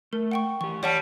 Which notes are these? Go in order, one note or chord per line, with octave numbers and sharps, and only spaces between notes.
A3 A#4
F#5 G5 C#6
E3 G4 C#6
G3 C#5 F#5 A5